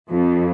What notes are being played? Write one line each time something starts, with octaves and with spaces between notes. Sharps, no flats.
F2